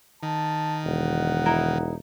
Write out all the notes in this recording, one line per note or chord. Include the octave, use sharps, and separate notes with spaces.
D#3 A5
E1 F#5
D#4 E4 A#4